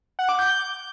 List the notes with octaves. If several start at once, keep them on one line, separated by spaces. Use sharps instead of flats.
F#5
D6
G6